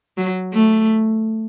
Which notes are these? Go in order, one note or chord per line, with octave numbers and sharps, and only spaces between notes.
F#3
A3